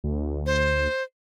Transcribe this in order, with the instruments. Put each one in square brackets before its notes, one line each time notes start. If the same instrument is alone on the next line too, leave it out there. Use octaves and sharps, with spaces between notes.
[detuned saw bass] D2
[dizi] C5